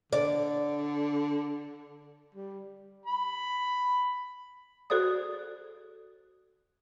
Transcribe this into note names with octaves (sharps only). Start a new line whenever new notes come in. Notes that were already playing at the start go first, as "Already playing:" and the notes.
D3 D5
G3
B5
F#4 G#4 A4 C5 D5 D#6